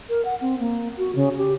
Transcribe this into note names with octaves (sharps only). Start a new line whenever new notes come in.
A#4
F#5
C4
A#3
F#4
C#3
G4